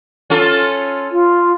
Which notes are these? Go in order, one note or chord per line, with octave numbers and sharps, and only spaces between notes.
C#4 F4 A4
F4